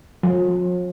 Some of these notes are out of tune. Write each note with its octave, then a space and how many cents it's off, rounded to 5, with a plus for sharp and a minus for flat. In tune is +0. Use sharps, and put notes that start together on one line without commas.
F3 +45